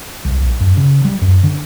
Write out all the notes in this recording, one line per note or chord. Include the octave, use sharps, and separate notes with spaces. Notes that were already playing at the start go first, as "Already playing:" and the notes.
C2
A#1
F#2
C#3
G3
F#2
D3